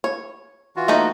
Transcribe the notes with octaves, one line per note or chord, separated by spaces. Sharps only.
C#5
E3 F4 F#4
A3 A#3 D#4